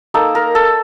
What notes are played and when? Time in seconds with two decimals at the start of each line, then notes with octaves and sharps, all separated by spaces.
0.14 A#3 D#4 A4
0.35 A#4
0.55 A4